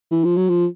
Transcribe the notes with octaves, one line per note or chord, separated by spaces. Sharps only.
E3
F3
F#3
F3